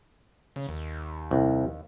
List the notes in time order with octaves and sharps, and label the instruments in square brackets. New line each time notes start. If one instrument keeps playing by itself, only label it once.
[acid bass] C#3
D#2
[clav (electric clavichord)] C2